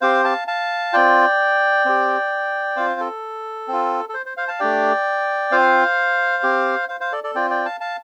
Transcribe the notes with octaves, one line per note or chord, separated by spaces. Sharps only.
C4 G4 C5 F5
F5 A5
F5 A5
C4 F4 D5 G5
C4 G4
C4 F4 C5 F5
A4
C4 F4
A4
C5
C5
C5 F5
F5 A5
A3 D4 G4 D5 G5
C4 F4 C5 F5
C4 G4
C5 F5
C5 F5
A4 D5
A4 D5
C4 F4 D5 G5
D5 G5
F5 A5
F5 A5